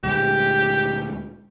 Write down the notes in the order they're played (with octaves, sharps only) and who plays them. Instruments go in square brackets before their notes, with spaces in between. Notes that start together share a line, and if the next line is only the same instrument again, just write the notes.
[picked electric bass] D2 A#2 G#3 [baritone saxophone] G4